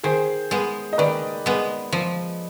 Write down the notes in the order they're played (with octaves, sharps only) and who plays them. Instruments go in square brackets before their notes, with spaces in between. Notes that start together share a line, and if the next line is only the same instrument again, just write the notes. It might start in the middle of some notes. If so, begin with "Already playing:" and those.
[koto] D#3 [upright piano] G#4 C5
[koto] G#3 B3
[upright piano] D#5
[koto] D#3 [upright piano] B4 D5
[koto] G#3 B3
F3